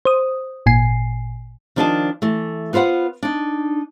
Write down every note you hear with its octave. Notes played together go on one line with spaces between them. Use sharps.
C5 D#6
G#1 A#2 G#5 C7
D#3 F3 D4 F4 D#5 A5
E3 A3
B3 F4 B4 C5 F#5
D4 D#4